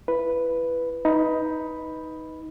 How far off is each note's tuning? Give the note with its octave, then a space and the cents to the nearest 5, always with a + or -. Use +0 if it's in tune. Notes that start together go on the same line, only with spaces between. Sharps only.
E4 +25 B4 +0
D#4 +15 B4 -5 B5 +0